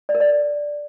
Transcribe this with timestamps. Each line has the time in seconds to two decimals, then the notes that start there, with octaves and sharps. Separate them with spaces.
0.09 D5
0.15 A#4
0.20 D5